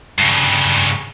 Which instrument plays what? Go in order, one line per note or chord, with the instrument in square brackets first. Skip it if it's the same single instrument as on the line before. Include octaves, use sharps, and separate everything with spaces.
[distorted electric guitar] G2 C#3